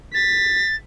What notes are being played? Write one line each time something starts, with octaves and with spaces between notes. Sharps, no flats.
A6 B6